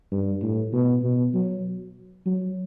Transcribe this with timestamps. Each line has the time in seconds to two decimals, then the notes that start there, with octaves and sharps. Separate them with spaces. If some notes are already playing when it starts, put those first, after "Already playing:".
0.11 G2
0.42 A2
0.73 B2
1.03 B2
1.34 F#3
2.26 F#3